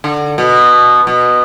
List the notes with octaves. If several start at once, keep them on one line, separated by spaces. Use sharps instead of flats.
D3
B2
B2